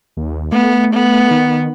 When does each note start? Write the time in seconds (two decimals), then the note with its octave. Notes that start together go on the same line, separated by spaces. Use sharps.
0.17 D#2
0.52 A3 B3
0.93 B3
1.31 D#3